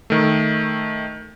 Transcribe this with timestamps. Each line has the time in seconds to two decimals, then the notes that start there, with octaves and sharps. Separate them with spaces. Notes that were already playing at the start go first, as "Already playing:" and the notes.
0.10 D#3 A3